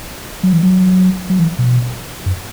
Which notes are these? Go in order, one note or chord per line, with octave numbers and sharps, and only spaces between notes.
F#3
E3
F#3
F#3
E3
B2
F#2